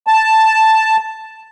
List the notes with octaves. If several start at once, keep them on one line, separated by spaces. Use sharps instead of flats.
A5